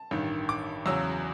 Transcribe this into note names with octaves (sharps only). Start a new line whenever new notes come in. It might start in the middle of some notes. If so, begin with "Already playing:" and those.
Already playing: A5
A1 G2 D#3
D6
E2 C#3 F#3 E6